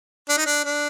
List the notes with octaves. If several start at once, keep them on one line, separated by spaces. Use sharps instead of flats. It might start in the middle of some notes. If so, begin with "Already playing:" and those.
D4
D#4
D4
D4